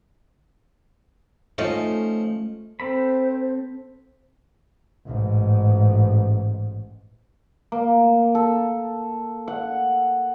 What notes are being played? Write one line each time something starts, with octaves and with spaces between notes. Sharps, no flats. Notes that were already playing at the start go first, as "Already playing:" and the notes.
F3 A3 C#4 D#4
C4 A4 C5 B5
A1 G#2
A#3
A4
F#5